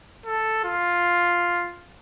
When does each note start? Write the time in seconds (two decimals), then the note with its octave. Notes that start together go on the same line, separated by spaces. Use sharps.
0.26 A4
0.64 F4